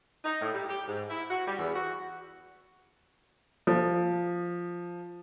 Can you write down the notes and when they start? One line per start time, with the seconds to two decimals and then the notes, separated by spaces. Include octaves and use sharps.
0.24 D#4
0.41 A2
0.54 G3
0.68 G4
0.88 G#2
1.10 E4
1.30 F#4
1.47 G3
1.58 E2
1.75 F#4
3.67 F3